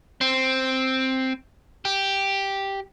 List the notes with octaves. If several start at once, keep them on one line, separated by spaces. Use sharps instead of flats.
C4
G4